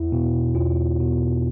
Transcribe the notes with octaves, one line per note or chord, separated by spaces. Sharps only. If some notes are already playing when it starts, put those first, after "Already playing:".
Already playing: E2 E4
B2
E2 F4
B2